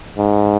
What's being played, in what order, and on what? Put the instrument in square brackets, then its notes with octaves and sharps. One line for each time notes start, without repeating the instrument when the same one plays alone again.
[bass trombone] G#2